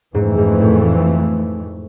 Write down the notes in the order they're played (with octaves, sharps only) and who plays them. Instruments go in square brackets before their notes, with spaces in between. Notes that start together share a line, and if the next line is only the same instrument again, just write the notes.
[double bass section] F2 E3 A3 [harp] G#2
[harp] G#2
A2